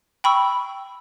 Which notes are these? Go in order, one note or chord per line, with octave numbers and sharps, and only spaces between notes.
G5 B5 C#6 E6